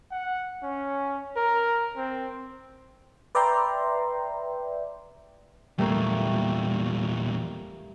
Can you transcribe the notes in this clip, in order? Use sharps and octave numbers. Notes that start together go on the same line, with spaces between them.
F#5
C#4
A#4
C4
B4 D5 E5 G5 A#5 C6
E2 A#2 G3 A3 A#3